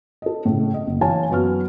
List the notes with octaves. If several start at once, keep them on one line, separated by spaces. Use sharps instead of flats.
A4 D#5
A2 C#3
D#5
F#1
E3 C#5 F5 G#5 A5
F#2 F#3 B3 F#4 F6